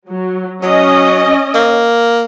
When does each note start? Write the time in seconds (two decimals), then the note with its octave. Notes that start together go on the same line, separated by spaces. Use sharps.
0.11 F#3
0.63 F#3 C#4 D#5
1.54 A#3